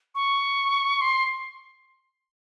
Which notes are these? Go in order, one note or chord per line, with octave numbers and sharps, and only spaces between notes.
C#6
C6